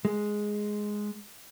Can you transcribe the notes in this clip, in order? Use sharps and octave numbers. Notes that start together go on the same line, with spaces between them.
G#3